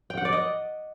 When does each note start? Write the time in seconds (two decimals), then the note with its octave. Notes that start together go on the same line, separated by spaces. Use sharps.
0.10 G5
0.18 F#5
0.25 D5
0.33 D#5